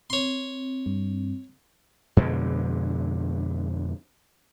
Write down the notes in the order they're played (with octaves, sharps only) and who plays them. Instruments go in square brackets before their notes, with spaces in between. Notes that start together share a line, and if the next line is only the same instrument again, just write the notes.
[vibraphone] C4 [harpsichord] C#5 C6
[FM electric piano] G2
[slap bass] F2 B2 D3 G#3